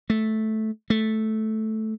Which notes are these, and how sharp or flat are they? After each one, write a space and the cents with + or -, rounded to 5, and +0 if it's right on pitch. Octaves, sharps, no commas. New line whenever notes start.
A3 -10
A3 -10